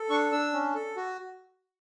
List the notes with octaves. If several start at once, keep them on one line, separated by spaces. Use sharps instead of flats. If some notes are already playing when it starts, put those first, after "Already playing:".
Already playing: A4
D4 C#6
D4 E6
C#4
A4
F#4